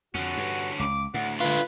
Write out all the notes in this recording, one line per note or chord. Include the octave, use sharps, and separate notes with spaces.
F2 D3 C#4 F#4
G2
C#2 D6
D2 A2 F#5
D3 F4 B4